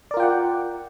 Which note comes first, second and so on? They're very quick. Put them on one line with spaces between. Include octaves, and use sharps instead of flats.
D5 A#4 F4 G5 F#5